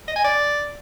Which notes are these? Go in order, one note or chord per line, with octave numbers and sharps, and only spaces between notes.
D#5
G#5
D5